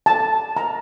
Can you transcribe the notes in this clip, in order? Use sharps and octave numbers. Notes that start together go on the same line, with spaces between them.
A5
A#5